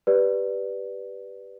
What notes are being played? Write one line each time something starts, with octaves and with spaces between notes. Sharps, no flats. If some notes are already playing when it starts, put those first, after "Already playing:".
G4 B4 D5